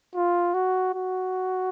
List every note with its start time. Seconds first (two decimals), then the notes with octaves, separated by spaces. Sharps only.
0.15 F4
0.54 F#4
0.94 F#4